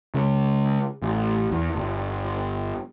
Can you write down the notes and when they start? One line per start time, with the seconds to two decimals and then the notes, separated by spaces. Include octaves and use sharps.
0.14 C#3 G#3
1.02 A1
1.51 E2
1.76 G1